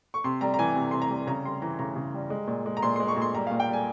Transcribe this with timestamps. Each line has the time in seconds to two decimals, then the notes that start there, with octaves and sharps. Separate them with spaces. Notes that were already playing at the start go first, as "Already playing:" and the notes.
0.14 C#6
0.24 C3 C6
0.41 G3 A#5
0.54 A#5
0.59 E3 G#5
0.75 C3
0.91 C3 C6
1.02 A#5
1.10 G3
1.27 C#3 A#5
1.45 G3 C6
1.62 E3 A#5
1.79 C#3 A#5
1.96 C#3
2.14 G3
2.30 G#3
2.47 A#2
2.66 G#3
2.77 A#5
2.82 A#2 C6
2.96 G#3 C6
3.08 C#6
3.16 A#2
3.22 C6
3.34 G3 A#5
3.47 A#2 F5
3.60 G5
3.69 G3 G#5